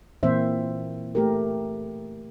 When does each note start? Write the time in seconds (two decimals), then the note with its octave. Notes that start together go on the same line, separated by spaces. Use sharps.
0.23 A#2 E3 A#3 C4 C5 E5
1.15 A3 G4 A#4